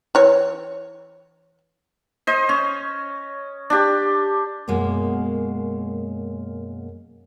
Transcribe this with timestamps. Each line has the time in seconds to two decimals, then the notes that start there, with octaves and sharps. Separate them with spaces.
0.15 E3 C#5
2.27 C5 D#5
2.49 C#4
3.70 D4 G4
4.68 F#2 B2 G#3 A#3